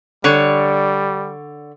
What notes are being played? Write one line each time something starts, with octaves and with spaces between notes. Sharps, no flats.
D3 G3 C#5